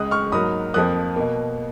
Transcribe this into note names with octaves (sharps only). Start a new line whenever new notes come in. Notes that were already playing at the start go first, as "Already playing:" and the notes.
Already playing: C#2 C#3 G#3 D#6 F#6
C#6 F6
G#2 F#3 A#3 B5 D#6
F2 F3 A#3 D#6 F#6
B2 A#3